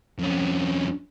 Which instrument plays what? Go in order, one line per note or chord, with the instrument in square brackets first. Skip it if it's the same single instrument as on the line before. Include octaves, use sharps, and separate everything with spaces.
[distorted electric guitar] F2 C#4